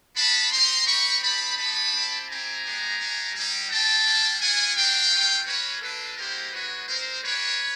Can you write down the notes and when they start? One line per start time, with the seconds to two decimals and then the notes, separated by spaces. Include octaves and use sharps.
0.16 B3 D4 F4 A5 B5
0.51 C4 D#4 G4 A#5 C6
0.86 C4 D#4 G4 B5 C#6
1.22 C4 D#4 G4 A5 B5
1.57 B3 D#4 G4 A5 B5
1.93 C4 E4 G4
2.28 C4 E4 G4 G#5 A#5
2.63 G#3 B3 D4 G4
2.99 A3 D4 G4
3.34 G3 A#3 D#4 G4
3.69 G3 C4 D#4 G5 A5
4.05 G3 A#3 D4
4.40 B3 D4 F4 F#5 G#5
4.75 A#3 D4 F#4 F5 G5
5.10 A3 C#4 F4
5.46 A#3 C#4 F#4 B4 C#5
5.81 A#3 D4 F4 A4 B4
6.16 G#3 B3 E4 G4 A#4 C5
6.52 G#3 B3 D#4 F#4 B4 C#5
6.88 G#3 C4 D#4 A#4 C5
7.23 A#3 D4 G4 B4 C#5